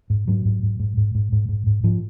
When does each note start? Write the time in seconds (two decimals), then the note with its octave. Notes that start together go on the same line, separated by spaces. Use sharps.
0.10 G#2
0.28 G#2 F#3
0.45 G#2
0.63 G#2
0.80 G#2
0.97 G#2
1.15 G#2
1.32 G#2
1.49 G#2
1.67 G#2
1.83 G#2 F3